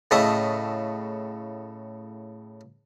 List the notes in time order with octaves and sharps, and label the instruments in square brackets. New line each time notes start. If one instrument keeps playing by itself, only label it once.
[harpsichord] A2 C#3 D#5 E5 A5 D#6